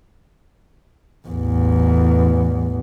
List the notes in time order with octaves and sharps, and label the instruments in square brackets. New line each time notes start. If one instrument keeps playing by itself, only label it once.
[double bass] A1 E2